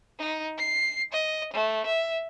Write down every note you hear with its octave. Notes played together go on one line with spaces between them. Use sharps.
D#4
C7
D#5
A3
E5